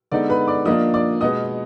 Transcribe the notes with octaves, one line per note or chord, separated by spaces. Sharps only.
D3 G#3 B3 D#4 D5
B4 B5
D5 D6
F3 A#3 D4 F4 D#5 D#6
D5 D6
B2 G#3 B3 D#5 D#6